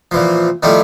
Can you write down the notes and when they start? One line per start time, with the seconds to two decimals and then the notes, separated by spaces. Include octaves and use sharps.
0.11 A#2 E3 F3
0.63 D#3 F3 G3 A3 E4